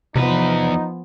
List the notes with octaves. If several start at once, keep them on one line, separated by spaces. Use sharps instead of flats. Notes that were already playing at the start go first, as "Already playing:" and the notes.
E2 C3 F3 B3 D#4 B4